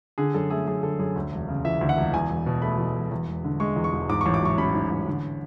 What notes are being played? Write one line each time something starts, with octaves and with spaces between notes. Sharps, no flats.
D3 G#4
F#2 A4
A3 G#4
F#2 G#4
D3 A4
F#2 G#4
D2
E1
C#3
E3 E5
D2
F#5
E1
E2 G#5
E1
B2
A3 B5
E2
E1
E2
E1
D3
G#3 C#6
E2
C#6
E1
G#2 D6
A1 C#6
D6
F#3 C#6
C#4 B5
G#2
A1
D3